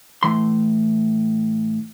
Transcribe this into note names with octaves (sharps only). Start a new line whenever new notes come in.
A2 E3 C6